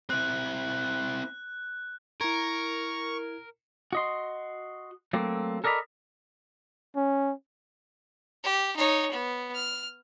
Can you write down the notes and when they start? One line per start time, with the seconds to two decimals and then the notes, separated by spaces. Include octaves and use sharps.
0.10 C4 E4 F#6
2.21 E4 A#4 C#6 G#6
3.93 F#4 D#5 C6
5.13 F#3 A3 A#3 C4
5.64 A4 A#4 D5 D#5 A#5 B5
6.96 C#4
8.44 G4
8.76 D#4 C#5
9.11 B3
9.54 F6